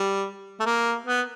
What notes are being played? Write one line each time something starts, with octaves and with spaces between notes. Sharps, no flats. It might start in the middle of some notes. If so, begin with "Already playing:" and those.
Already playing: G3
A3
A#3
B3